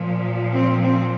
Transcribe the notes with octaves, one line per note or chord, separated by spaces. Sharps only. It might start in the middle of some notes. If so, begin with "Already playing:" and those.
Already playing: A#2 F3
C4
C4